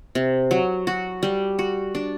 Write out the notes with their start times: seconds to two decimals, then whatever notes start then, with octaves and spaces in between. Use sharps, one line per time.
0.15 C3
0.51 F#3
0.87 F#4
1.23 G3
1.59 F#4
1.95 D4